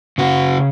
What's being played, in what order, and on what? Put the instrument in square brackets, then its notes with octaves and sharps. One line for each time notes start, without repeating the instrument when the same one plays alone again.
[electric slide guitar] C#3 F#4